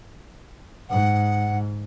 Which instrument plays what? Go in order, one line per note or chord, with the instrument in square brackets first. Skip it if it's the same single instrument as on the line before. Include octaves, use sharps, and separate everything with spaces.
[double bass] G#2 [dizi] F#5